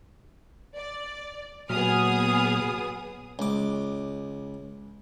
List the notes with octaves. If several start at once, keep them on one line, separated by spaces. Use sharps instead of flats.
D5
A#2 F#3 B3 G#4 D#6 F6
C#2 D6